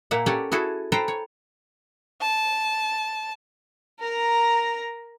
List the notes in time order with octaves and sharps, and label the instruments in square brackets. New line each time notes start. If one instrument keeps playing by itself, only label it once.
[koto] A#2 A#3 E5 F#5
C#4 G4 A4 C#5 D5 F#5
E4 F#4 G#4 A4
A4 B4 C5 G5 A#5
C#5
[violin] A5
[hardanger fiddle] A#4 A#5